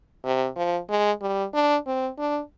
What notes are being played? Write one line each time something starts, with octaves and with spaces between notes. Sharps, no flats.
C3
F3
G#3
G3
D4
C4
D4